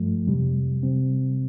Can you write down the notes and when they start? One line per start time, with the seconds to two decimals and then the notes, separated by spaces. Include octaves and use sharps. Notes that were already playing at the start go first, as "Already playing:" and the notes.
Already playing: G2 F3 A3
0.27 F2 C3 G3
0.83 C3 G3 C4